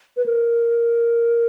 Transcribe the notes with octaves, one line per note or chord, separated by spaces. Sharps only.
B4
A#4